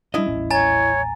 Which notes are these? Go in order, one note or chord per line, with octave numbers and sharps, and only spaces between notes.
G3 D4 E4 D#5
D#1 A1 C#4
C#5 G#5 A#5 A6